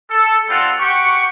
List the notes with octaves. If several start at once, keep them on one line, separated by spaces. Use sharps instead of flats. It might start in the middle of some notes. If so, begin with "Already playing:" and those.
A4
G3 C4 F4 A4 F#5
G4 F#5 C#6